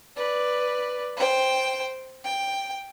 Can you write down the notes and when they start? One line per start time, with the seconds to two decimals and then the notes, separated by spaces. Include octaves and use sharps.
0.16 B4 D5
1.17 C5 G5
2.25 G5